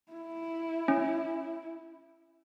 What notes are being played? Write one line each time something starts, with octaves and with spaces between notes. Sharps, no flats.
E4
C#4